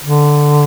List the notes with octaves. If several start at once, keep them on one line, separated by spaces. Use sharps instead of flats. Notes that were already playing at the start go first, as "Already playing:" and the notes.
D3